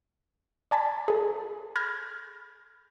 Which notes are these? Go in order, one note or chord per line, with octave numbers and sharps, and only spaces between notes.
D5 G#5 A5 B5
G#4 A4
B5 F6 G6 G#6 A#6